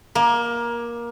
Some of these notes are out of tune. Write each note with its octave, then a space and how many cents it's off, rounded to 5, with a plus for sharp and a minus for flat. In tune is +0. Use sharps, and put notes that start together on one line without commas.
A#3 +20